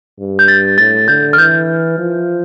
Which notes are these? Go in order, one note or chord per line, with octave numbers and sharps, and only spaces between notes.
G2
G6
A6
A2 A6
D3 G6
F6
E3 G6
F3